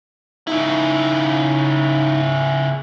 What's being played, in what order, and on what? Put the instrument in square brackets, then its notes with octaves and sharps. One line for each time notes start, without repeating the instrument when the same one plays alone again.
[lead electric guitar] C#3 E4 [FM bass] D#4